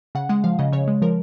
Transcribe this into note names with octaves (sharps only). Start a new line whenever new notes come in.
C#3 F#5
G#3 F#5
F3 F5
C#3 D#5
C#3 C#5
G#3
F3 A#4